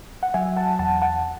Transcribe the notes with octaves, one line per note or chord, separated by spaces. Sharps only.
F#5
F#3 E5 G#5
F#5 A5
E2 F#5 A5
F#5 A5